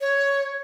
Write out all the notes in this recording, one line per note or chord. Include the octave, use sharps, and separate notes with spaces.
C#5